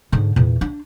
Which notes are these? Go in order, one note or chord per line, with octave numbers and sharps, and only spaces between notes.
G#2 D3
E2 A#2
D4